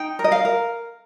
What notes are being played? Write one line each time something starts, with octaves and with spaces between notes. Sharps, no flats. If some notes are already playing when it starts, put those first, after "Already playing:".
Already playing: D#4 G5
A#4
D#5
F5
A#4